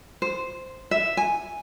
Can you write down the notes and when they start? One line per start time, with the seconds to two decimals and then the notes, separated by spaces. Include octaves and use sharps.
0.22 C5
0.91 E5
1.17 G#5